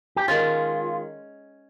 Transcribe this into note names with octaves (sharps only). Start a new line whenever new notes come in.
G4
D#3 G#3 C#4 F4